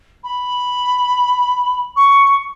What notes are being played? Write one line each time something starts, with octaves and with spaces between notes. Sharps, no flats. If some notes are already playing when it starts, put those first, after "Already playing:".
B5
C#6